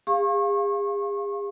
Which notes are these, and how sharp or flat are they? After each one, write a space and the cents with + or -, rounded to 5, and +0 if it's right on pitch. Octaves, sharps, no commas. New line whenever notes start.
G#4 -40 F5 +0 C#6 -35